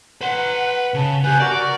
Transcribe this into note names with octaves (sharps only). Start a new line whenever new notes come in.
B4 F#5 C6
C#3 A5
B3 G4 G#5 F#6 G6
F#4 A#4 D5